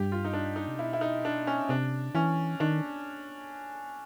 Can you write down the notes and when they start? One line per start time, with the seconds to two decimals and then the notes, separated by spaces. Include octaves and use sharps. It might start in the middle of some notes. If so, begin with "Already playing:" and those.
Already playing: G2 G4
0.12 F4
0.25 D#4
0.33 D4
0.56 D#4
0.68 C3
0.79 B2 E4
0.93 E4
1.01 D#4
1.25 D4
1.47 C#4
1.69 C3 D4
2.15 E3 C#4
2.60 D#3 D4